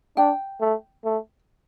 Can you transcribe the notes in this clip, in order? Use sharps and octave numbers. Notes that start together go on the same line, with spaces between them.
D4 G5
A3
A3